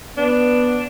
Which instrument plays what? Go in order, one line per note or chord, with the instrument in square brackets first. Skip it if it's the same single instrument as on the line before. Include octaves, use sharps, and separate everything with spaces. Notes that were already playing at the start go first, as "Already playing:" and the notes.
[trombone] B3 [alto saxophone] D4